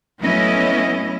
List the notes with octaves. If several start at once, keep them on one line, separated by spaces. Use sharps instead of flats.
F#3 A3 B3 C#4 E4 D#5